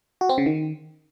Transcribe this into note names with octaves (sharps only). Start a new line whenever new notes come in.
F#4
C4
C#3
D#3